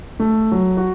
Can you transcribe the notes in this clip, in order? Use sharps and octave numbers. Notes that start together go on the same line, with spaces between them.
A3
F#3
F#4